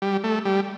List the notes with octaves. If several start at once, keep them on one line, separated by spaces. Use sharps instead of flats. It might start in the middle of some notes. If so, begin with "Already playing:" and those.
G3
A3
G3